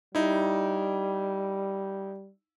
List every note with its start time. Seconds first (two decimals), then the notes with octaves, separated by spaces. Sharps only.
0.15 G3 D#4 E4